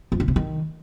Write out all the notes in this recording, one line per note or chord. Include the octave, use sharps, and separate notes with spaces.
F2
D3
C3
D#3